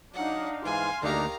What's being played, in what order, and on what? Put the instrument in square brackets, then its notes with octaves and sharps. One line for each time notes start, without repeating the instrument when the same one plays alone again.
[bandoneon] F#3 [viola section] D4 D#4 F5 [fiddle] F#5
[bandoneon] G#2 E3 [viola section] F5 C6 [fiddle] G#5
[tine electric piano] D2 [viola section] D#3 G4 [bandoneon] A#3 D4 D#4 [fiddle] F5 A#5